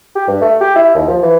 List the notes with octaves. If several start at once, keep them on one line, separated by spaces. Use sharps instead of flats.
G4
G2
A3
G4
E4
D#2
F3
E3